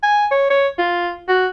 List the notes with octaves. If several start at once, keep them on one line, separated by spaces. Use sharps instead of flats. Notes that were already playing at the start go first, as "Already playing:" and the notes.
G#5
C#5
C#5
F4
F#4